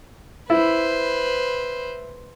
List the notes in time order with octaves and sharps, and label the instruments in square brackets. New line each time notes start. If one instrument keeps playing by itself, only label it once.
[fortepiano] E4 [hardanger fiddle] B4 C5